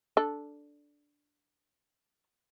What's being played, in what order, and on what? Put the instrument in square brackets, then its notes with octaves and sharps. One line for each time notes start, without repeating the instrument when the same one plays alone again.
[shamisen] D4 A4